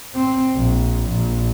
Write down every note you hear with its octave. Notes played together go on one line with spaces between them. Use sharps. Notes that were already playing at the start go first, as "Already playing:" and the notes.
C4
A#1
A#1